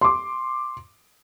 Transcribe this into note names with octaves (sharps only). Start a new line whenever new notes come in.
C6 D6